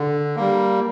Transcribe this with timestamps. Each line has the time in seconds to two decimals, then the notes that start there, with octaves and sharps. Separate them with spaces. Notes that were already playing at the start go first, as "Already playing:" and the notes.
Already playing: D3
0.36 G3 A#3